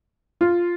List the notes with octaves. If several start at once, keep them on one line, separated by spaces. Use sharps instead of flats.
F4